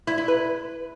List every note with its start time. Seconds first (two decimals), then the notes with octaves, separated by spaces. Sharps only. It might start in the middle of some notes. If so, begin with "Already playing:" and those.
0.07 E4
0.18 E4
0.28 B4